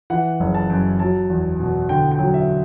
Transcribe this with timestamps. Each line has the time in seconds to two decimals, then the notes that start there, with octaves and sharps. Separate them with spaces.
0.10 E3 F#5
0.40 F#1
0.55 A5
0.70 F#2
0.99 F#3 A5
1.30 E2
1.60 B2
1.89 D3 G5
2.11 G5
2.19 F#3
2.34 E5